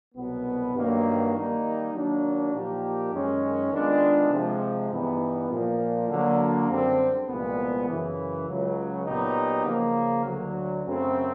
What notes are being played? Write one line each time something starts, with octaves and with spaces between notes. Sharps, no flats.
C2 B2 F#3 B3
G2 D#3 F#3 A#3
D#3 G3 A#3 D#4
D#3 F#3 A#3 D4
A#2 F3 A#3 D#4 G4
F#2 D#3 G#3 C#4
D#3 G#3 B3 D4 F4
C3 F3 G#3
G2 E3 G3 B3 D#4
A#2 F3 A#3
D3 F#3 A#3
F#2 D3 G3 C4
C2 A#2 F3 G#3 B3
F#2 C#3 E3
C#2 C#3 F#3
A#2 F#3 B3 D#4 G4
C#3 F3 A#3
D2 D3 F#3
F#2 C#3 F#3 A3 C4